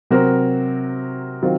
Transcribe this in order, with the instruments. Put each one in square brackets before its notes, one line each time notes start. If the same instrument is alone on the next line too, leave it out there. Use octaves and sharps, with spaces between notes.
[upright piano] C3 F#3 C4 F#4 A#4
D#3 F#3 C4 F4